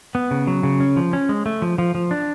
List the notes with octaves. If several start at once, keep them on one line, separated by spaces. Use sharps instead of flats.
B3
C#3
F#3
C#3
C#4
F3
C#4
G#3
A3
F3
F3
F3
D4